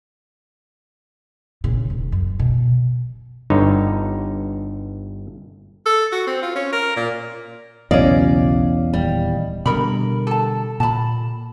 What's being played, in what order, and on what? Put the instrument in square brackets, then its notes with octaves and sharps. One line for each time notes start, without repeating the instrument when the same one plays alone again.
[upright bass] A#1 C#3
D#1
F#2
B2
[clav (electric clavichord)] G1 G2 D3 D#4 C#5
[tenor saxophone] A4
F#4
C4
F4
C#4
A#4
A#2
[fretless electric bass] B1 C#3 F#3 [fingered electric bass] E2 [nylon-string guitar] C#4 D5 [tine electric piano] D#5 F5
[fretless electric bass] D#1 [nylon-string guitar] G3
[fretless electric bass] B2 D3 G3 [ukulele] A4 A#4 B5
[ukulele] A4 A5
[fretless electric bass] A#2 [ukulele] A5 B5